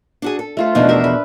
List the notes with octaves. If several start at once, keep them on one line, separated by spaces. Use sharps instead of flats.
D4 F#4 G#4
A4
A3 F4 C5
E2 B2 F3 A3 D4 D#4
A#4 C5 E5
B4